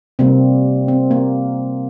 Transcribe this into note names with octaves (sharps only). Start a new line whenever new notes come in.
C3 G3 A#3 C4
C4
A#3